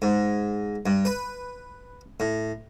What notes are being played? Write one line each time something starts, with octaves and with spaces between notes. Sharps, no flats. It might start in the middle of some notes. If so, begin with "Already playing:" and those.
G#2
G2
B4
A2